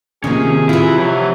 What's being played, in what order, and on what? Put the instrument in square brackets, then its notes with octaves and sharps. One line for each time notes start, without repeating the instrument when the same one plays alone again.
[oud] C3 [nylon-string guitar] D#3 F3 A#3 [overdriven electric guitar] C#4 [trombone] G#4
[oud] C3 E3 [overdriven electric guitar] E4 [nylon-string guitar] F4
[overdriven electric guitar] F3 E5 [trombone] F#3